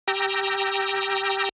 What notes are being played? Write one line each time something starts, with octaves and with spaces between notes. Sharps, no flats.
G4 G5 A#5 E6 A#6